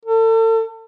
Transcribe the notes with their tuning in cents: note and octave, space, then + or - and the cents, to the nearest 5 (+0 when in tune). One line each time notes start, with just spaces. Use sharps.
A4 +35